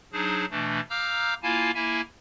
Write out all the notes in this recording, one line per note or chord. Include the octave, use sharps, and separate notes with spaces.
F#3 D4 D#4 G#4 C5
B2 E3 A3 D4
F5 A#5 D6 E6 F6 G6
A#3 E4 F4 F5 G#5 A5
A#3 E4 E5 G#5